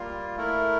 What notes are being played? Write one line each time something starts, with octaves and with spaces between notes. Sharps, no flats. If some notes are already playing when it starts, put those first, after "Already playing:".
Already playing: G3 A#3 F4
A3 E4 A#4